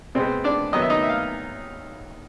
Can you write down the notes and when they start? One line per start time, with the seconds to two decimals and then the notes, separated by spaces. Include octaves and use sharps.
0.15 B2 G#3 B3 C4 C5
0.44 D4 D5
0.73 D#3 F#3 B3 D#5
0.82 E5
0.90 D#4 D#5
1.03 E5
1.09 F5